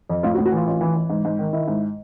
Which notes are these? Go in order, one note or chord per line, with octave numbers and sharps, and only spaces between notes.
F2
A2 F4
F#4
A2
F#4
E3 F4
A1 F4
E3
E3
G#2
G#2
D#3
D#3 E4
G#2